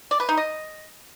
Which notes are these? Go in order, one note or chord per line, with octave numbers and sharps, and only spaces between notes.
D5
B4
D#4
D#5